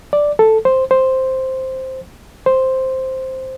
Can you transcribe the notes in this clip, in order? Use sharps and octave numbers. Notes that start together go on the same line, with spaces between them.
D5
A4
C5
C5
C5